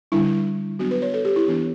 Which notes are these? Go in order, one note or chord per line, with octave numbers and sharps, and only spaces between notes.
D3 G3 D4 E4
F#3 B3 D4 F#4
B4
C#5
A4
G4
E4
E3 B3 D4